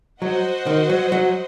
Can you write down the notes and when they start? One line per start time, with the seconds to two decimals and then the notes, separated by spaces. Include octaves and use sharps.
0.22 F#3 F#4 C5 D#5 F#5
0.66 D#3
0.90 F#3
1.12 F#3